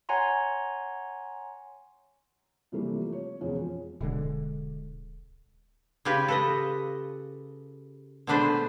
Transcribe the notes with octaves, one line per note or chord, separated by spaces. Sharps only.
C#5 F#5 G#5 A#5 C6
C3 E3 F3 G3 A3 A#3
C#5
E1 F2 F3 G#3 B3 C#4
D1 B2 D3 G#3
C#3 F4 G4 B4 G#5
A4 B4 D#5
B2 G#3 A3 D4 B4 C5